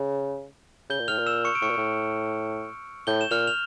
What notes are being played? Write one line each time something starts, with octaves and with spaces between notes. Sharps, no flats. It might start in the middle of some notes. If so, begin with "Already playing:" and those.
Already playing: C#3
C#3 G6 G7
A#2
A2 F6 F7
A#2
E6 E7
C#6 C#7
D7
A2 C#6 C#7
A#2
A2
A2 G6 G7
E7
A#2 F6 F7
F7